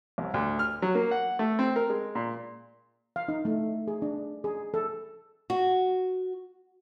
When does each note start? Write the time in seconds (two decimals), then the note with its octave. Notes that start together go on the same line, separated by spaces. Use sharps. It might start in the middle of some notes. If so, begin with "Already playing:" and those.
0.18 C2
0.34 D2
0.59 F6
0.82 F#3
0.95 A#3
1.11 F#5
1.39 A3
1.59 C4
1.76 A#4
1.90 G#3
2.15 A#2
3.16 F5
3.28 D#4
3.45 A3
3.87 G#4
4.02 D4
4.44 G#4
4.74 A4
5.50 F#4